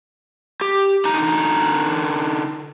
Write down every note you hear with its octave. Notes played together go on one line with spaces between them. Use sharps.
G4
D3 D#4 A#5